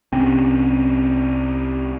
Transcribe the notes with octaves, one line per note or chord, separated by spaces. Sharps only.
C2 C4 C#4